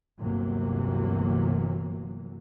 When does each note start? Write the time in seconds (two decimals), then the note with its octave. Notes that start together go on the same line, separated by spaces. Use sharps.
0.19 G1 D2 C3 E3 F#3 A#3